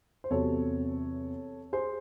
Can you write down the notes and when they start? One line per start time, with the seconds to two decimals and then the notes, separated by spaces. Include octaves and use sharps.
0.24 C5
0.30 E2 C3 F#3 A4 C#5
1.73 G#4 C5